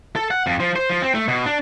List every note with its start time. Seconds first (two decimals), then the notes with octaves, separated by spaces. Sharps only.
0.16 A4
0.31 F#5
0.47 F2
0.60 F3
0.76 C5
0.90 F3
1.02 C4
1.14 A3
1.28 B2
1.46 D4